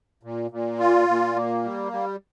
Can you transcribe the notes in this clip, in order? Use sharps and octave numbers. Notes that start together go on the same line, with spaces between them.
A#2
A#2
F4
A#2
A#3
G3
G3